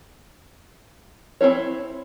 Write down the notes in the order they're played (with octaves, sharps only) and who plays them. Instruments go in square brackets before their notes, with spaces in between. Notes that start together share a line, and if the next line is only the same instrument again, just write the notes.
[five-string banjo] C4 D#4 E4 C#5